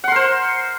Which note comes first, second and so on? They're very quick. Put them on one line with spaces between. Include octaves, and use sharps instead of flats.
F#5 C6 A#4 C5